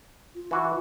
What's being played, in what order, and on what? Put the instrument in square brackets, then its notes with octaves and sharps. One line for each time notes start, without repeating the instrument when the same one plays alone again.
[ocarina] F4
[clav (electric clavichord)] E3 F#4